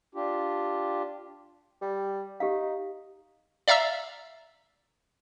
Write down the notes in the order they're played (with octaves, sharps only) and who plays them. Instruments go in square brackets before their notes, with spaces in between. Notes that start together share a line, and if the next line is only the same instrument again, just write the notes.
[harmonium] D4 F4 G4
[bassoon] G3
[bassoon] D#4 [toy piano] G4 F5
[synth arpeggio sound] D5 E5 F5 A#5 E6